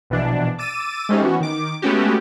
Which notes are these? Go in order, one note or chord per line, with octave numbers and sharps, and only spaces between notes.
A#1 B2 E3 D4
D6 E6 A6 D#7
G#3 A3 C4 C#4 D#4 G4
E3 B3 C#4 F#4
D#3 D6
G#3 A3 B3 C#4 F#4 G4